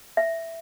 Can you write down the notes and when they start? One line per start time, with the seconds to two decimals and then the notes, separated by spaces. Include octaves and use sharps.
0.17 E5